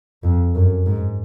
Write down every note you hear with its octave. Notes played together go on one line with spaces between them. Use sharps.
F2
F#2
G#2